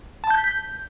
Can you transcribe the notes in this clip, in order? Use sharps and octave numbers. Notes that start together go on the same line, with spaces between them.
A5
G6
B6
G6